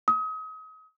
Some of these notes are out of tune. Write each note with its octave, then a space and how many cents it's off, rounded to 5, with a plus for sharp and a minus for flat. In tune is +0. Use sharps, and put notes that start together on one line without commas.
D#6 +35